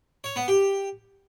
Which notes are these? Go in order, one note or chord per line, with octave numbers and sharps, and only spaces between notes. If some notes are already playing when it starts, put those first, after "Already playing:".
C#5
B3
G4